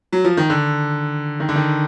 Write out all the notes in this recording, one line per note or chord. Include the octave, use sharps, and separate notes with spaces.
F#3
F3
D#3
D3
D#3
D3
D#3